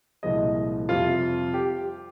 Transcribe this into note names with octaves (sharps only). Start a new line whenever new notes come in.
C2 A#2 F3 G#3 D#5
F2 C3 G3 F4
G4